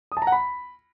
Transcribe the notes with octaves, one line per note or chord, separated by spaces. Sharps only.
D#6
A5
A#5
F#5
B5